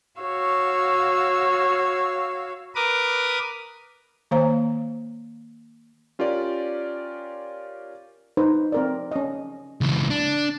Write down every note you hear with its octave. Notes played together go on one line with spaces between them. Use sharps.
F#4 C#5 F5 E6
A#4 B4 D6 D#6
D#3 A#3 C5 F5 A#5
C#4 F4 G4 A#4 D5
D#4 B4 C5
C4 A#4 D5
C#4 D#5
C#2 E3
D4